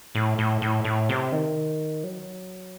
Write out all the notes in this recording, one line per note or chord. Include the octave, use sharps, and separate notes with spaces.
A2
A2
A2
A2
C3
D#3
F#3